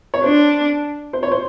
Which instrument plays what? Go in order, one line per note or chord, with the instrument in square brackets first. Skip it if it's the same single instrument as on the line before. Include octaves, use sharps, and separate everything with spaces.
[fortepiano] C#5
[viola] D4 [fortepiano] C5
[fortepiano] C5
C#5
C5